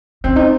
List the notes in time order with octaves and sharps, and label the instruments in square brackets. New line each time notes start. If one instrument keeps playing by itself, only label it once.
[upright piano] C4 [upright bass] C#4
[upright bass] D#4